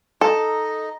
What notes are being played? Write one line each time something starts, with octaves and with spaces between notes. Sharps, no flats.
D#4 A4 D#5